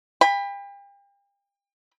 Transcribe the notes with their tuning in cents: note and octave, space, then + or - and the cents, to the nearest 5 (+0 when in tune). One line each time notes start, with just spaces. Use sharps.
G5 +40 B5 +0